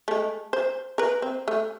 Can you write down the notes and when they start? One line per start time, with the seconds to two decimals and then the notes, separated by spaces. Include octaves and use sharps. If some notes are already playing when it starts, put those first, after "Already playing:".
0.08 G#3 A3
0.53 C5
0.98 A#4 B4
1.22 C4
1.48 A3